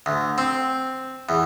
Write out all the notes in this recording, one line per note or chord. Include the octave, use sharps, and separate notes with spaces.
D2
C4
E2